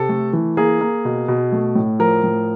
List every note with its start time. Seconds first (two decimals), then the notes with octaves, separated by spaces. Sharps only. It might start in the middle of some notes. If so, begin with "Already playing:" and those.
Already playing: C3 A4
0.09 A3
0.33 E3
0.57 A#3 G#4
0.81 A#3
1.05 B2
1.28 B2
1.52 A3
1.75 A2
1.99 F3 A#4
2.23 A2